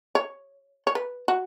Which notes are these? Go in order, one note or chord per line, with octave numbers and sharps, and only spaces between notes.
C#5
C#5
B4
F#4